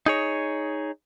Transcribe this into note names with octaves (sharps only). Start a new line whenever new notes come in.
D#4 G#4 C#5